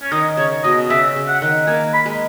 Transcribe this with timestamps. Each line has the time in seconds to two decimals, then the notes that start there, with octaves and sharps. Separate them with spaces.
0.02 C#4
0.12 D#3 D#4
0.37 C#3 C#5
0.64 B2 D#5
0.90 C#3 E5
1.16 C#3
1.28 F#5
1.42 D#3
1.67 A#3 G#5
1.94 B5
2.06 G#3